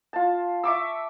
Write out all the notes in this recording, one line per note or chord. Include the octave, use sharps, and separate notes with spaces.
F4 A5
E5 C#6 D6 E6